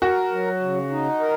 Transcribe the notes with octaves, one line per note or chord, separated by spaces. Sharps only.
F#4 A#4
F#3
C#3
D#4
A#4